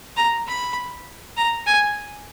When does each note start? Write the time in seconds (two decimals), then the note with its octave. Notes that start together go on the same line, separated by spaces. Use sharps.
0.17 A#5
0.47 B5
1.37 A#5
1.67 G#5